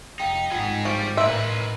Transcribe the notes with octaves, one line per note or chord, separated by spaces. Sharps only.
F1 D#4 F5 G5
G#1 D#4 F4 G#4 D#5 F#5
F3 G3 D5 C#6
A2 A#3 D#4 B4 E5 C6